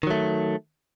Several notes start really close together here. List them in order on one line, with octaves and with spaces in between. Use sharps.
D#3 F#3 A3